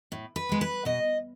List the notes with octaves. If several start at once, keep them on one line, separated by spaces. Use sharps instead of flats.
A2
B4
G#3 B3
B4
B2 D#5